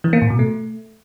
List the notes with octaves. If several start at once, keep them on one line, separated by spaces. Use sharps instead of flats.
E3
A#3
A2
B2
A3